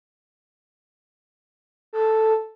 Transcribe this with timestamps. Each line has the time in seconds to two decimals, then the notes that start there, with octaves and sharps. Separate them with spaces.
1.93 A4